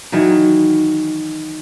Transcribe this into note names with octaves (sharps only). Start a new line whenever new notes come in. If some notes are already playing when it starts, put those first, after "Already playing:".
D#3 E3 F#3